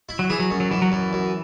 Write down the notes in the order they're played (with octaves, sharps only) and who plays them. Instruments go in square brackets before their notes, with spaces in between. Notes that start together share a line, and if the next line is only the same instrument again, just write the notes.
[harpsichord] E4
[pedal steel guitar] F#3
[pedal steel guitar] E3 [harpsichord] G#4
[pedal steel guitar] F#3
[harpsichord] F#2
[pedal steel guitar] F#3
[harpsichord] F#2 [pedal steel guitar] E3
[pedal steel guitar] F#3
[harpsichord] F#2 [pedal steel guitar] E3
[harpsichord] F#2